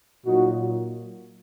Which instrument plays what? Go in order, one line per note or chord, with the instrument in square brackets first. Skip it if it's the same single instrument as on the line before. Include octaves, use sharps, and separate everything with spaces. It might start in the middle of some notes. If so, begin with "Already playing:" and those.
[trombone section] A#2 F#3 D#4 F#4